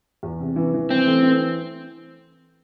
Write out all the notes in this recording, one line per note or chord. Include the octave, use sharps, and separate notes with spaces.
E2
C3
E3
E3
E3 C4
A3
E3